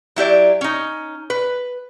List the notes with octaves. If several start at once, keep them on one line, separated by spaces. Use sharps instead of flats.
F#3 E4 G4 D5
C#4 D#4
B4